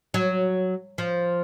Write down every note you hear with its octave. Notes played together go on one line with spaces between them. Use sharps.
F#3
F3